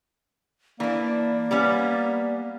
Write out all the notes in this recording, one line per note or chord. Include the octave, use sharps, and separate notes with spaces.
E3 A#3 D4 D5
G3 B3 C#4